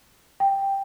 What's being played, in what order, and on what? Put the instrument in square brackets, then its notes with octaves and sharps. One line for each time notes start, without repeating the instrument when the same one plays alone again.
[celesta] G5